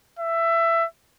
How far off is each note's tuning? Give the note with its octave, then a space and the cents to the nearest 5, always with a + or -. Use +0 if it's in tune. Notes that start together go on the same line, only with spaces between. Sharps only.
E5 +15